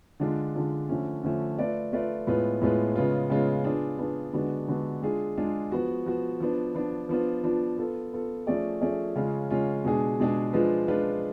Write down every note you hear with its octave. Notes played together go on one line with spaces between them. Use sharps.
D3 G#3 D4 F4
D3 G#3 D4 F4
D3 F3 A3 C#4
D3 F3 A3 C#4
A3 F4 B4 D5
A3 F4 B4 D5
A2 G#3 B3 F4 B4
A2 G#3 B3 F4 B4
C#3 G#3 B3 F4
C#3 G#3 B3 F4
B3 D4 F4 G#4
B3 D4 F4 G#4
D3 G#3 B3 D4 F#4
D3 G#3 B3 D4 F#4
G#3 D4 F4 G#4
G#3 D4 F4 G#4
F3 B3 F#4
F3 B3 F#4
F3 B3 D4
F3 B3 D4
F3 B3 D4 F4
F3 B3 D4 F4
B3 F4 A4
B3 F4 A4
F3 A3 C#4 G#4 D5
F3 A3 C#4 G#4 D5
C#3 G#3 C#4 F4
C#3 G#3 C#4 F4
B2 G#3 D4 G#4
B2 G#3 D4 G#4
F3 G#3 D4 F4 B4
F3 G#3 D4 F4 B4